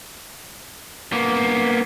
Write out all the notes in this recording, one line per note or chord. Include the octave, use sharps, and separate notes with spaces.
A#3 B3